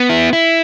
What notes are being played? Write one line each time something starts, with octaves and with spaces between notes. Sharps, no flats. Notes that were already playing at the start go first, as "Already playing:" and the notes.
Already playing: B3
E4
E4